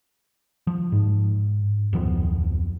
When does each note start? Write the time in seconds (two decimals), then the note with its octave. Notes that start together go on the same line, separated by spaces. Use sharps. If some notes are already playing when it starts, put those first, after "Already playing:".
0.67 F3
0.92 G#2
1.93 D1 F2 F3 B3